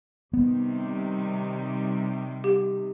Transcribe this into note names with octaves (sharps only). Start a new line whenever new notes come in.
C3 D#3 G3 B3
G4